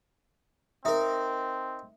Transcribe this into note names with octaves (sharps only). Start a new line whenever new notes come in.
C4 D#4 A#4 E5